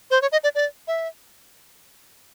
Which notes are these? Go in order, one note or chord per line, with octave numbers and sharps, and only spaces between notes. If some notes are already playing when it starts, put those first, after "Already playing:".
C5
C#5
D#5
D5
D5
E5